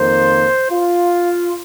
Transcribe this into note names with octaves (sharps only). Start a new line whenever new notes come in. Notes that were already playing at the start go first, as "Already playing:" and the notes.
Already playing: F2 D#3 A#3 C5
F4